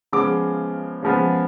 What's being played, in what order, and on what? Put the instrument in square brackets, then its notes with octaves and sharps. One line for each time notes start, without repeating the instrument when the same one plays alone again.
[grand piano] C#3 F3 G#3 B3 D6
C#3 F3 G#3 B3